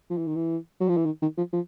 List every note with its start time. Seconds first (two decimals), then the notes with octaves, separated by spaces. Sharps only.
0.10 F3
0.18 E3
0.27 D#3
0.36 E3
0.80 F#3
0.89 F3
0.97 E3
1.05 D#3
1.22 D#3
1.37 F3
1.53 F3